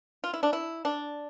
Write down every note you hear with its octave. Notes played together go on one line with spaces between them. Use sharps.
F4
E4
D4
E4
D4